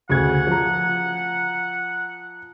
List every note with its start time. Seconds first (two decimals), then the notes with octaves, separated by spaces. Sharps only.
0.10 D2 C#3 F#5 G#6
0.47 F3 A#5